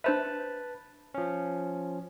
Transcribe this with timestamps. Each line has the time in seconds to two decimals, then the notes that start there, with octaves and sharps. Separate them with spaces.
0.04 D4 B4 C5 E5 A5
1.14 F3 C#4